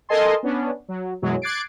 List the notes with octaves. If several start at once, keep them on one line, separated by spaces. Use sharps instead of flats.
A4 A#4 D#5 G#5 A5 C6
B3 C#4 D4
F#3
F#2 B2 E3 F#3 G#3
D6 F#6 G#6 A6 C7 D7